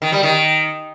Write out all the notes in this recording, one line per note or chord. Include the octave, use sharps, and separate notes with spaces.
D#3
G3
D#3